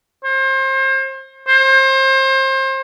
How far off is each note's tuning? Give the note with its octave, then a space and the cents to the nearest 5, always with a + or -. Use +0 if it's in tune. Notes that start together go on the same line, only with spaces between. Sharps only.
C5 +35
C5 +30